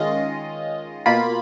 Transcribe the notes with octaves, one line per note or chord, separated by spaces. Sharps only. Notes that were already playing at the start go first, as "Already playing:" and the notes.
Already playing: D#3 G#3 C#4 F4 D#5
B2 A#3 F4 B5